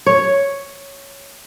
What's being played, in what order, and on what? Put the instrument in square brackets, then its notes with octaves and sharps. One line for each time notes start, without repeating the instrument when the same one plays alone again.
[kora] C#5